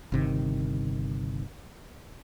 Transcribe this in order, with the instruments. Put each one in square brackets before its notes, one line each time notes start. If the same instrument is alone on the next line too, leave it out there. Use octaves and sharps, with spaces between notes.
[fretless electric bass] G1 C3 D#3